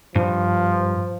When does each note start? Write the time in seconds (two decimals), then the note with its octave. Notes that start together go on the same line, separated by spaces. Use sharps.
0.15 G2 F3